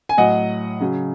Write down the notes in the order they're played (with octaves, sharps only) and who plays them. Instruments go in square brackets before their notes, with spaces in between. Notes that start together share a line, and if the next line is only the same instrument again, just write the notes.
[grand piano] G#5
A2 F#3 D#5 F#5
C#3 F#3